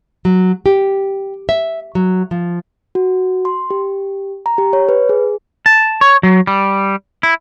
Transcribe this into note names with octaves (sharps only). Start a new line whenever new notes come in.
F#3
G4
E5
F#3
F3
F#4
C6
G4
A#5
G4
C#5
B4
G#4
A5
C#5
F#3
G3
E4